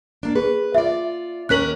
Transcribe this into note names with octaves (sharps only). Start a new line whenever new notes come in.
A#3 D4
G#4 B4
F4 D5 E5
D#2 C#4 A#4 F#6 B6 F#7